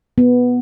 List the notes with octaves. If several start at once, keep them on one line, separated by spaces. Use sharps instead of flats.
B3